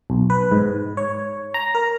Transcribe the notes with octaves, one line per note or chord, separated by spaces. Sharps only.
B1
B4
G#2
C#5
A#5
A#4